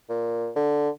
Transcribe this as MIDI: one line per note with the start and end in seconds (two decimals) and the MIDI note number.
0.09 0.50 46
0.56 0.90 50